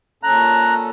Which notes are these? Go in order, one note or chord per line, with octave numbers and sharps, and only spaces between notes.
A#2 C#4 A4 A#5 F#6